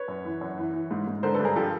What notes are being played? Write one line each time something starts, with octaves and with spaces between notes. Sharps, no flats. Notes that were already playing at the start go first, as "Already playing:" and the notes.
Already playing: B4 C#5
F#2
E3
F#2
E3
E3
G#2
G#2
D3 A#4 C5
A4 B4
G2
G#4 A#4
F3 G4 A4